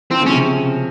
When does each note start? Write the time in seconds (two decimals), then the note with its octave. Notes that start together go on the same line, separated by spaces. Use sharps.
0.11 F3 C4
0.21 C#3
0.26 C#4
0.31 C3